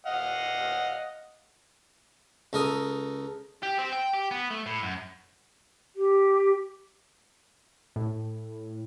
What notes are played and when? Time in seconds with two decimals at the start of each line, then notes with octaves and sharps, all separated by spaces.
0.06 D#5 F5 F#5
2.53 C#2 A4 A#4 D#6
3.63 G4
3.79 C4
3.92 G5
4.14 G4
4.31 B3
4.50 A3
4.66 A2
4.82 F#2
5.96 G4
7.96 A2